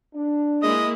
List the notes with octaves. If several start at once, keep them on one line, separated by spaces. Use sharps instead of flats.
D4
G#3 A#3 E4 D#5